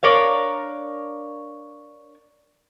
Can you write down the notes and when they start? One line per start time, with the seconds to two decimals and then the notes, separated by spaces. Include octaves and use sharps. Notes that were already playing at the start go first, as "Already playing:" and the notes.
0.03 D4 A#4 C#5 F5